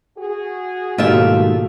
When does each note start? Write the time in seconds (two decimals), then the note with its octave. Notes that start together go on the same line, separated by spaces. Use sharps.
0.18 F#4 G#4
0.98 G#2 B2 D#3 A3 A#3 F4 G4 E5